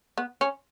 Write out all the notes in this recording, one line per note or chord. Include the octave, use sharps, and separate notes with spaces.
B3
C#4